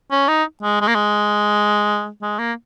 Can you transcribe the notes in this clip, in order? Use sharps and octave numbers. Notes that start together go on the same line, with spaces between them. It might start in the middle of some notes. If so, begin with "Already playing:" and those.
C#4
D#4
G#3
G#3
A#3
G#3
G#3
A#3